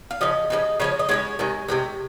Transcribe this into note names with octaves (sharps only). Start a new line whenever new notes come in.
F5
C#3 F3 D#5
C#3 F3 G#3
C#3 F3 G#3 C#5
D#5
C#3 F3 G#3 C#5
C3 D#3 G#3
C3 D#3 G#3